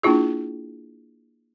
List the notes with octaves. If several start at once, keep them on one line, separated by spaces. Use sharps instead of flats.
A#3 D4 E4 F4 G#4